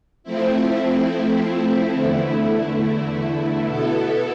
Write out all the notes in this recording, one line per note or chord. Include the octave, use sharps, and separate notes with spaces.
F3 A3 C4 E4
E2 D3 A3 E4
B2 B3 E4 A4